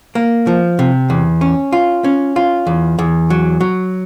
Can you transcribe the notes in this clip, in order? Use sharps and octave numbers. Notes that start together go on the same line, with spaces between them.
A#3
F3
C3
E2
C#4
F4
C#4
F4
E2
E2
F#3
F#3